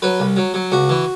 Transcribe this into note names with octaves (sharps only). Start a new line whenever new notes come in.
F#3 B4
C2
F#3
F#3
C#2 F#4
E3